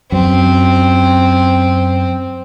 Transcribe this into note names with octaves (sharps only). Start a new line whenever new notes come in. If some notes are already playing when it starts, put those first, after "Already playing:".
F#2 C4